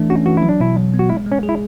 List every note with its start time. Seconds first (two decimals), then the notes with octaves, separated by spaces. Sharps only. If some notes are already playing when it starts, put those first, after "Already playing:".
Already playing: E3 A3 D4
0.10 C#4 F#4
0.26 E3 F#4
0.37 E4
0.43 F#3
0.49 D4
0.60 B2 E4
0.77 F#3
0.94 B3
0.99 F#4
1.09 G#3 E4
1.26 G#3
1.32 C#4
1.43 G#4
1.49 E4